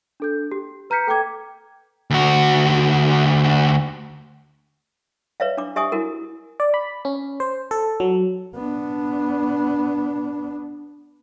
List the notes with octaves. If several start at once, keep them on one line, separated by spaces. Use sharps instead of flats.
D4 A4 G6
G4
B4 A#5 F6 G6 B6 C#7
A4 G5 A#5 D6 G#6
D2 F#4
B4 C#5 E5 F5
D4 D6
G4 E5 G#5 C#6 D#6
E4 F#4 A#4
D5
B5
C#4
C5
A4
F#3
B3 D4